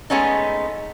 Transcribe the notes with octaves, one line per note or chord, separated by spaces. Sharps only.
G#3 A3 B3 C#4 D#4